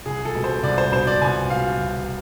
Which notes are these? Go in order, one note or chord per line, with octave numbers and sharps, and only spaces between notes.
C2 G#4
A4
B2
C5
C2 D5
C5
B2 C5
D5
C2 G#5
B2 F5
C2